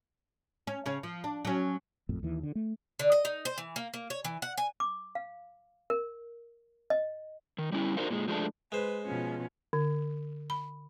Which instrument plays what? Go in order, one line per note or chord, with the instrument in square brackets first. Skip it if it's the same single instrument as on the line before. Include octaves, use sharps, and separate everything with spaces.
[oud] C#4
C#3 C#4
F3
D4
F#3 C#4
[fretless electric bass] G#1 F2 A2
D#2 E3
D3
A3
[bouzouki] D3
D#5
D#4
C5
E3
A#3
A#3
C#5
E3
F#5
G#5
[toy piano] D6
F5
A#4
D#5
[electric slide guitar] D#3
G3 C#4 E4
D#4 F#4 A#4 C5 D5 F5
A#2 G#3
F3 G#3 A3 D4
[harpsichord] G#3 C5 [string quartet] B4
[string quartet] B2 F3 C#4
[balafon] D3
B5